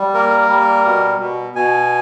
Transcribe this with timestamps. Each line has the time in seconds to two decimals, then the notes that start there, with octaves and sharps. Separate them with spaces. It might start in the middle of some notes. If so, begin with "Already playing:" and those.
Already playing: G3
0.14 A#3 A#4
0.50 G3
0.85 B2
1.20 B2
1.55 B2 G#5